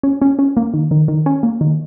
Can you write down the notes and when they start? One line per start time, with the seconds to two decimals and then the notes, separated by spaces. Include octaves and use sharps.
0.03 C#4
0.22 C#4
0.39 C#4
0.57 A#3
0.74 D#3
0.91 D#3
1.08 D#3
1.26 C#4
1.43 A#3
1.61 D#3